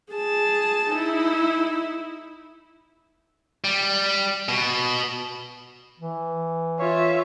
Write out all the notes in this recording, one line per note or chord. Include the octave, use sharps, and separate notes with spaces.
G#4 A5
D#4 E4
G3
B2
E3
F4 C#5 E5